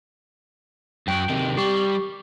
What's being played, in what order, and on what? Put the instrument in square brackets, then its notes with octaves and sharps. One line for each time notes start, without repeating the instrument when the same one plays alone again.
[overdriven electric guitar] F#2 F#4 [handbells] G5
[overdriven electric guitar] C3 D#3
[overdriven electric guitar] G3 [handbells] G4 C#6